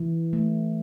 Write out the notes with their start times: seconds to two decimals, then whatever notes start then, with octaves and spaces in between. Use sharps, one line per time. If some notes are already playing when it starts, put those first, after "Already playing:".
Already playing: E3
0.33 A3